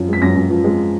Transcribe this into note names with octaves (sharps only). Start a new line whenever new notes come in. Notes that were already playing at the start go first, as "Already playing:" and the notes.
Already playing: F#2 F3
G#3 B6
F#2 A#6
F#2
F3
G#3